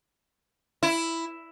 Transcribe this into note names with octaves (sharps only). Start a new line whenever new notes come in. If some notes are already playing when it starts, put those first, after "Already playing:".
E4